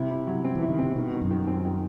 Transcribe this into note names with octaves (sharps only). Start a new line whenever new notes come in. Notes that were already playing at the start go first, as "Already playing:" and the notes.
Already playing: C3 E4
E4
F#3
C4
E3
E4
D#3
C3 C4
B2 D#3
D#3
F#2
D#3
C4
D#3